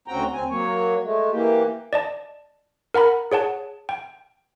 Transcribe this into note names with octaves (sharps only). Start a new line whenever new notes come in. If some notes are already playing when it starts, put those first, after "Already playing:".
D2 C#3 C4 F#4 G5 A#5
D2 C4 G#5
F#3 A#3 C#5
G#3 A3
E3 A#3 G4
D5 D#5 A5
A#4 F#5 A#5 B5
G#4 C#5 F#5 A5
G5